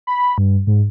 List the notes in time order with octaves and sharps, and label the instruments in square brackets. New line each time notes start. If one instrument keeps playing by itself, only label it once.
[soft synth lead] B5
G2
G#2